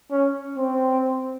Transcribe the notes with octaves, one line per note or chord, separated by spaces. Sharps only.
C#4
C4